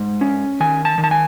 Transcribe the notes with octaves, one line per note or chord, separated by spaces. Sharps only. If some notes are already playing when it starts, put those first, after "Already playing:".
Already playing: G#2
C#4
D#3 G#5
A5
D#3
A5
G#5